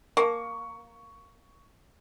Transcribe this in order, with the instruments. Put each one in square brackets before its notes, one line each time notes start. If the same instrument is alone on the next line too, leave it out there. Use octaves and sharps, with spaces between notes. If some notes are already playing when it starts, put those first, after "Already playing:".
[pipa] A#3 [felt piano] C#6